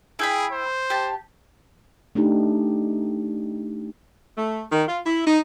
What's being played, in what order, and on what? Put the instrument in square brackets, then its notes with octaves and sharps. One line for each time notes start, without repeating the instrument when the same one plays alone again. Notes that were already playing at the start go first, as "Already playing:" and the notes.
[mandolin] E4 G5 B5 [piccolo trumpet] G#4
[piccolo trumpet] C5
[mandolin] G4 A5
[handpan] A3 D4 D#4 G4
[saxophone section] A3
D#3
F4
E4
D#4